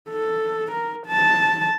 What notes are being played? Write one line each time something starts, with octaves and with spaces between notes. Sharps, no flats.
A4
A#4
A5